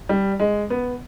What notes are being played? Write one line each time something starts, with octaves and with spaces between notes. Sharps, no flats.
G3
G#3
B3